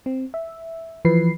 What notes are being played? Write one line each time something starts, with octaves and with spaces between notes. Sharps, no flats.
C4
E5
E3 F3 B4 C7